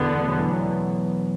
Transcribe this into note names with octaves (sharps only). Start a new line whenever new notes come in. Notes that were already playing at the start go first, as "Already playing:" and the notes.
Already playing: E2 B2 D3 E3 B3
A3
F#3
E3 A3
F#3 B3